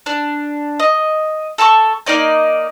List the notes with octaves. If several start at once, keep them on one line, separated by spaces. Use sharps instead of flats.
D4
D#5
A4 A5 A#5 C#6
A#3 D#4 D5 D#5